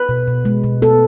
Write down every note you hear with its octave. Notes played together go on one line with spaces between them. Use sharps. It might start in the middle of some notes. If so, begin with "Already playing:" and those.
Already playing: B4
B2
B2
G#3
B2
B3 A4